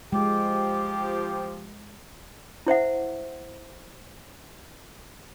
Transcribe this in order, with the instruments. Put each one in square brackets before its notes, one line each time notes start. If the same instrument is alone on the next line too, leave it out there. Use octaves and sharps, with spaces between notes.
[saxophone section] F3 G4 [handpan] G#3 [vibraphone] G5 D6
[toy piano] E4 C5 E5 F#5